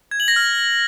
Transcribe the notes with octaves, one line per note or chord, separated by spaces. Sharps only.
G#6
F#7
A#6
F6